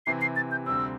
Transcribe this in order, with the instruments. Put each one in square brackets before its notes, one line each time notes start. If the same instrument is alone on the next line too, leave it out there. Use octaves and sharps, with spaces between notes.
[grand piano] C3 E3 C4 [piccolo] C7
[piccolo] C7
A6
G6
[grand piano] D2 C3 G3 C4 [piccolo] E6